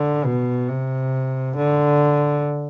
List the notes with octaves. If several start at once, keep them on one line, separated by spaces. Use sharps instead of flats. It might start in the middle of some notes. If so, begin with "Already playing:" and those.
Already playing: D3
B2
C3
D3